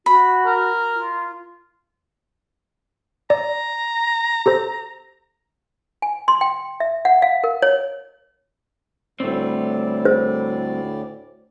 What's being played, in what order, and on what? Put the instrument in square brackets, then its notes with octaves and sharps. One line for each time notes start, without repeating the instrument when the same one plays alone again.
[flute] F#4 [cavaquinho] B5
[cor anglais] A#4
[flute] F4
[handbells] D5 [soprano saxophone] A#5
[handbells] G4 A4 C5
[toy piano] G#5
C6
G5
E5
F#5
F5
A#4
C#5
[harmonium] D2 A2 D5 [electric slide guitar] G3 A3 C4
[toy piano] C5